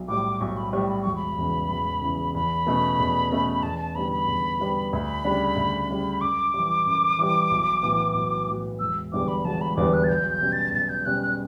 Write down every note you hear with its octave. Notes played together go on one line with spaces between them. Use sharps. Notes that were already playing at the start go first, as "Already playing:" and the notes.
Already playing: B1
A2 G3 D6
B1 C#6
B5
A2 G3 C#6
B5
E1 C#6
B5
E2 C#3 E3
E1
E2 C#3 E3
E2 B5
B2 A3 C#4
E2
B2 A3 C#4
E2 A5
A5
D3 G3 B3 B5
B5
E2
D3 G3 B3
D2 B5
C#3 G3 D4
D2
C#3 G3 D4
F#2 D6
E3 G3
F#2
E3 G3
B1
A2 E3 B3 F#4
B1
A2 E3 B3 F#4
E1 E6
E2 D3 G3 B3 D6
B5
E1 A5
B5
E2 D3 G3 B3 D6
F#6
A6
B1 G6
G6
B2 G3 C#4
A6
B1 A6
G6
B2 G3 C#4 F#6
F#6